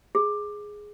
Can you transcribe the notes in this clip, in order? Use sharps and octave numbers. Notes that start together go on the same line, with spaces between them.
G#4